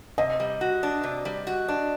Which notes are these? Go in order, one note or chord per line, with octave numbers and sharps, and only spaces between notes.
C3 D#5
G3
F#4
D4
C3
G3
F#4
D4